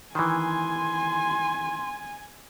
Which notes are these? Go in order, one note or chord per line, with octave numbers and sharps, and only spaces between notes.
D#3 E3 G#5 C6